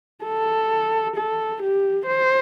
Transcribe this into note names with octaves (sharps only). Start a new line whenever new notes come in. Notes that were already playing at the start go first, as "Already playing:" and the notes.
A4
A4
G4
C5